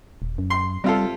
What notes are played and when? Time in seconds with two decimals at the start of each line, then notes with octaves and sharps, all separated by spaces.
0.22 D#1
0.38 F#2
0.50 C6
0.84 C3 G3 F4 A4